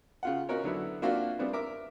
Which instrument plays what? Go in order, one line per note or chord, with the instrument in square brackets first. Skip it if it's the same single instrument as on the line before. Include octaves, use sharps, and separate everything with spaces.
[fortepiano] C#3 F4 F#5
C#4 D#4 F#4 A#4 C#5
D3 F#3 B3 E4
A#3 C4 D4 F4 F#4 E5
C3 G3 B3 C4 D4
A#4 E5 D6